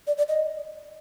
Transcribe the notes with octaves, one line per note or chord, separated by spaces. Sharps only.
D5
D5
D#5